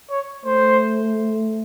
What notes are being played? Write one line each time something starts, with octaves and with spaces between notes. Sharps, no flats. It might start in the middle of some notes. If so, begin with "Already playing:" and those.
C#5
A3 C5